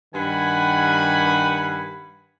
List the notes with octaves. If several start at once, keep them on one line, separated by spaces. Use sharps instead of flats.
G2 D#3 F#5 G#5 B5